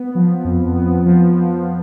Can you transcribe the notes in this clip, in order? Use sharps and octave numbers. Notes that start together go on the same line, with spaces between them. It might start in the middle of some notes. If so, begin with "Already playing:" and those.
Already playing: B3
F3
F2
B3
F3
F3